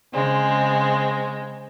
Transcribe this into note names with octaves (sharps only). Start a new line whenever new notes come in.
C#3 G#3 C4